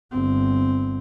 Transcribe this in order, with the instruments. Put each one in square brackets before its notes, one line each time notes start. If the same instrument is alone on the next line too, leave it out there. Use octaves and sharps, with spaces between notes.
[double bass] G1 C4